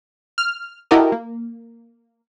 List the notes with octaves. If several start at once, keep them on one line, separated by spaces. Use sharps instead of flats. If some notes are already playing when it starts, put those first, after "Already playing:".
F6
E4 F#4 G4 A4 A#4 D#5
A#3